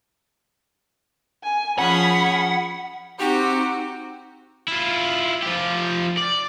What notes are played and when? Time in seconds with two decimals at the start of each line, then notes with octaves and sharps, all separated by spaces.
1.43 G#5
1.79 F3 C#4 G#4 F#5 B5
3.20 C4 D#4 F#4 G4
4.68 E4 F4
5.42 F3 G4
6.18 D5